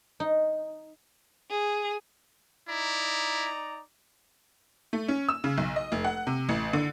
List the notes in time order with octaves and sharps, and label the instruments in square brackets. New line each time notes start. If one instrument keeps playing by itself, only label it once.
[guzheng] D#4
[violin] G#4
[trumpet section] D#4 D5 A#5 [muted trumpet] E4
[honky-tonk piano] A3
C#4
E6
C#3
B1
D#5
F1
F#5
C3
A1
D3